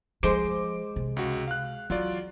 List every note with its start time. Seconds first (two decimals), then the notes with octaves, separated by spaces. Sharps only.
0.23 F3 G#3 C5 D6 D7
0.96 C3
1.17 C#2 F#4
1.48 F5 F#6
1.90 E3 F#3 F4 D5